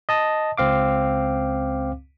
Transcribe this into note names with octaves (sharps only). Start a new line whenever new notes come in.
D#5 A5 D#6
C#2 C4 F5 D6